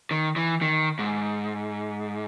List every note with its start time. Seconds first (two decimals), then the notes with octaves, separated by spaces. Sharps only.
0.11 D#3
0.36 E3
0.62 D#3
0.99 G#2